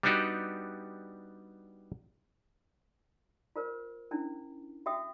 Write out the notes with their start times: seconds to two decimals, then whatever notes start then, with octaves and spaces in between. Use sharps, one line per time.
0.03 G3 B3 D4 D#4 F#4 G4
3.56 F4 A#4 C5
4.11 C#4 D4 E4
4.86 F#4 E5 G5 D#6